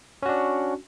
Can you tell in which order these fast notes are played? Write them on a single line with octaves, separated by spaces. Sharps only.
C#4 F#4 D4